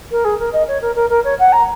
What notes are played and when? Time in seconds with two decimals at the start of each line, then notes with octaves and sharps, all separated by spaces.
0.11 A#4
0.24 G#4
0.39 A#4
0.53 D#5
0.68 C#5
0.81 A#4
0.96 A#4
1.10 A#4
1.24 C#5
1.39 F#5
1.52 A#5